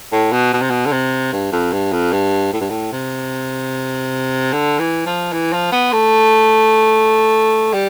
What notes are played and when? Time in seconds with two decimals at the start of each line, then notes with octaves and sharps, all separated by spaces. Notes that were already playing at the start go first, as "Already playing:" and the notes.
0.12 A2
0.32 B2
0.53 B2
0.61 C3
0.70 B2
0.86 D3
0.92 C3
1.33 G2
1.52 F2
1.73 G2
1.92 F2
2.13 G2
2.53 A2
2.61 G2
2.70 A2
2.92 C3
4.53 D3
4.79 E3
5.06 F3
5.33 E3
5.53 F3
5.72 B3
5.92 A3
7.73 G3